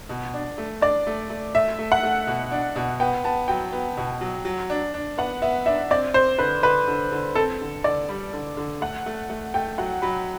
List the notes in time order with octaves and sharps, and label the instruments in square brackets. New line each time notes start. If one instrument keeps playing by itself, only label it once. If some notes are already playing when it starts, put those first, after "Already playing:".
[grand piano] B2
D4
A3
[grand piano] D4 [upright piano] D5
[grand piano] A3
A3
[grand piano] A3 [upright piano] E5
[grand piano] A3
[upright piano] F#5
[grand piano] A3
B2
D4
B2
[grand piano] B3 [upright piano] G5
[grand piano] B3 [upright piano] A5
[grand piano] F#3 [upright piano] G5
[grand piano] B3
B2
F#3
F#3
D4
D4
[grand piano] B3 [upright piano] F#5
[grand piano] B3 [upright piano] E5
[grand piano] D4 [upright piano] E5
[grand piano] C4 [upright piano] D5
[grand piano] C4 [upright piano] C5
[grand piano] D3 [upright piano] B4
[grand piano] D3 [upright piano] B4
[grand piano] D3
D3
[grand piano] C4 [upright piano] A4
[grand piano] D3
[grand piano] D3 [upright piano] D5
[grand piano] G3
D3
D3
[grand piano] A3 [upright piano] F#5
[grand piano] A3
A3
[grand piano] A3 [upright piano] G5
[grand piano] F#3 [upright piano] F#5
[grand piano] F#3 [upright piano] B5